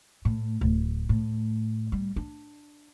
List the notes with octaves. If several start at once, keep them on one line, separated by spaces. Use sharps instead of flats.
A2
D1
A2
G3
D4